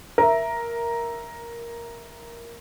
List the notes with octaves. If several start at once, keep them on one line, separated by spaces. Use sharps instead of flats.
A#4 E5